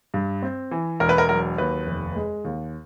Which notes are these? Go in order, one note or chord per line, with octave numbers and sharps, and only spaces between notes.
G2
C4
E3
E1 A#4
B4
A#4
F#3 A#4
D#2 B4
F1
G#3
D#2